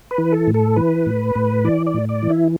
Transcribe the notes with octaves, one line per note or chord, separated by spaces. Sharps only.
B4
E3
A4
A2
A4
E3 B4
A2
A2
E3 D5
D5
A2
D5
E3
E4